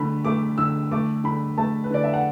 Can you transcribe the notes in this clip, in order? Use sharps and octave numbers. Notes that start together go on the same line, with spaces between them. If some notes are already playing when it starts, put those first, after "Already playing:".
Already playing: D3 A3 B5
A3 D6
D3 E6
A3 D6
D3 B5
A3 A5
B4
D3 D5
E5
F#5